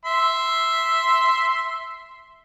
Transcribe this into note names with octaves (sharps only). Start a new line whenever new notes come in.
E5 C6